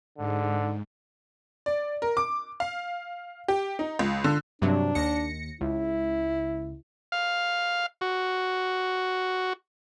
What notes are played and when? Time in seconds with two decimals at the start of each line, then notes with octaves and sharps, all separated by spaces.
0.18 G#2 D3
1.66 D5
2.02 A#4
2.17 D6
2.60 F5
3.48 G4
3.79 D#4
3.99 C#2
4.24 D3
4.62 G2 C3 F#3 D4
4.95 D#2 A#6 C#7
5.61 C#2 E4
7.12 F5
8.01 F#4